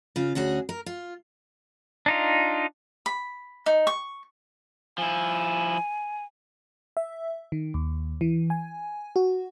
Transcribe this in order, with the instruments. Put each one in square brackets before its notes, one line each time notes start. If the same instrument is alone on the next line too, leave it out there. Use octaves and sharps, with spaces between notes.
[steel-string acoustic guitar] C#3 F4
D2 C#4 F#4 G#4
A#4
F4
[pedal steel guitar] D4 D#4 F4
[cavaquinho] B5
D#4
C#6
[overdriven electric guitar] F3 E4 [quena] G#5
[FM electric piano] E5
D#3
D#2
E3
G#5
F#4